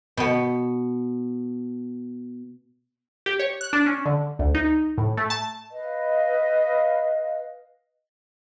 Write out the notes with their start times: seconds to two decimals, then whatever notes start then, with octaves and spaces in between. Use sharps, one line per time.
0.17 B2 B3
3.26 G4
3.40 C#5
3.61 F#6
3.73 D4
3.86 C#4
4.06 D3
4.39 D2
4.55 D#4
4.98 A2
5.17 A3
5.30 A5
5.70 B4 D#5 F5